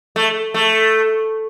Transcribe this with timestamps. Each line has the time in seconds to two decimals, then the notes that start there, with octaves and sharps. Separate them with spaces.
0.16 A3
0.54 A3